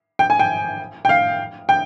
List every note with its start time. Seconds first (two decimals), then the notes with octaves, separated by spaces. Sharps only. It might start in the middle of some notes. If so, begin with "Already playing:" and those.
0.19 G5
0.30 G#5
0.39 G5
1.05 G5
1.09 F5
1.69 G5